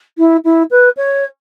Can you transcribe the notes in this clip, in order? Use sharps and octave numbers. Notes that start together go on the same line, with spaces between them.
E4
E4
B4
C#5